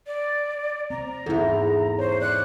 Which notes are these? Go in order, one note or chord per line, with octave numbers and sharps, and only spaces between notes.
D5
C3 C4 A#5
E2 G#2 E4 A4
C5 C#5
D5 F#6